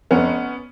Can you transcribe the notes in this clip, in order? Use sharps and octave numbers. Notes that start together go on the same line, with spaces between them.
F1 B3 C#4